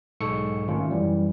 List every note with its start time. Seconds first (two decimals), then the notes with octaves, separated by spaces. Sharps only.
0.21 B1 G#2 G#3 A4 C#6 C#7
0.67 D#3 A3 C#4 F4
0.91 F#2 E3 G3